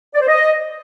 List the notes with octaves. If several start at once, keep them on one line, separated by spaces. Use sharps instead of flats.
D5
C5
D#5